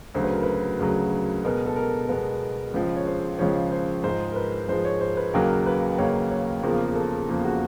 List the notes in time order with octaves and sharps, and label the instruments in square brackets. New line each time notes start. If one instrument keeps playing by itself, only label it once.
[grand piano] D2 C#3 F#3 C5
B4
A#4
B4
D2 C#3 F#3
B2 G#3 B3 A#4
A4
A#4
B2 G#3 B3
C#2 C#3 F3
C#5
C5
C#2 C#3 F3 C#5
C5
G#2 F3 G#3 C5
A#4
B4
G#2 F3 G#3 C5
C#5
C5
B4
D#2 C#3 F#3 A#3 A#4
B4
D#2 C#3 F#3 A#3 C#5
C#5
E2 C#3 F3 A#3 A#4
A4
E2 C#3 F3 A#3
F#4